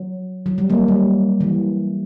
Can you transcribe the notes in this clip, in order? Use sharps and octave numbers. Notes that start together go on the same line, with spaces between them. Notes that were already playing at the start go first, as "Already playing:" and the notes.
Already playing: F#3
F#3
G3
F#3 A#3
G3
E3